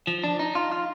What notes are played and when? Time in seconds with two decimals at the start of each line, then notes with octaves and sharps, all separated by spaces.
0.07 F3
0.24 D4
0.39 D#4
0.55 F4
0.72 F4